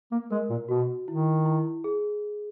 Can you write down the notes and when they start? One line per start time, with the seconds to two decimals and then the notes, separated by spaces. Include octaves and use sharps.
0.11 A#3
0.31 G#3 A#4
0.50 A#2
0.69 B2 F#4
1.08 D#3 E4
1.46 E4
1.84 G#4